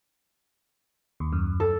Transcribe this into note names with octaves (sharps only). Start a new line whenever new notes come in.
D#2
F#2
A4